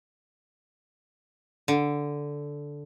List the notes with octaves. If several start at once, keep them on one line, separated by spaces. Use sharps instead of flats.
D3